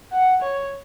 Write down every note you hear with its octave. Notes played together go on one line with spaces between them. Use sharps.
F#5
C#5